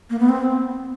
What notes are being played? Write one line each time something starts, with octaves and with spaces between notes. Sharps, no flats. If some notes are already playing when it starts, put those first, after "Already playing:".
A#3
B3
C4